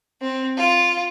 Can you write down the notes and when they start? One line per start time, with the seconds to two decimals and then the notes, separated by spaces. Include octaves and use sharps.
0.21 C4
0.57 F4